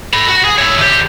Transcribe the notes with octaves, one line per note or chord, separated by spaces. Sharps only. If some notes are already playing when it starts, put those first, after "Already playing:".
A4 B5
F#4
G#4
C#5 E5
D3 G4